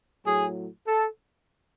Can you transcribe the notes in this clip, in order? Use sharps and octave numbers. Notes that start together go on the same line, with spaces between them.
A2 F#3 G#4
A4